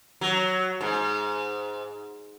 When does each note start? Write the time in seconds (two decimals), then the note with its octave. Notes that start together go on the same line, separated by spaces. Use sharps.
0.21 F#3
0.81 G#2